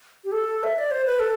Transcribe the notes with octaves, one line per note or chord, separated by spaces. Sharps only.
G4
A4
E5
D5
C5
B4
A4